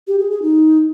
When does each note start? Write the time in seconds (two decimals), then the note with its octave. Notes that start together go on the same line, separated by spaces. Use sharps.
0.07 G4
0.19 G#4
0.31 G#4
0.42 D#4